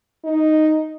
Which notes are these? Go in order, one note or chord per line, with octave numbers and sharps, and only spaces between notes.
D#4